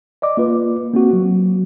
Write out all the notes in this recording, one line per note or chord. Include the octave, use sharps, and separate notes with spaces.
D5 D#5 D6
A#3 F4 B4
A#3 C4 F#4
F#3